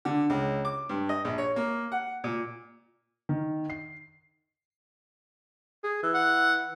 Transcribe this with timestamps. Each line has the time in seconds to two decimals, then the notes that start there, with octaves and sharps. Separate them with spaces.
0.05 D3
0.30 C#2
0.65 D6
0.89 G2
1.09 D#5
1.25 A#1
1.38 C#5
1.56 A#3
1.92 F#5
2.24 A#2
3.29 D#3
3.70 C7
5.84 G#4
6.03 E3
6.14 F#5